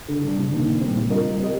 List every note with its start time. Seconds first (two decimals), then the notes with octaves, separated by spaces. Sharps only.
0.08 D3
0.24 G3 D4
0.38 C3
0.52 D#3 A#3 D#4
0.67 A#2
0.81 G3 C4
0.96 G3
1.10 D4 F4 A#4 D#5
1.25 G3
1.39 C4 G4 A#4 D#5